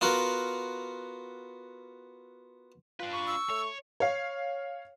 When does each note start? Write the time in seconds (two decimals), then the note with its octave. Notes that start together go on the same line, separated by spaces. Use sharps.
0.01 B3 F4 F#4 A#4
3.00 D4 F4 B4
3.13 C#6
3.27 E6
3.50 A3 C#5
4.00 C#5 F5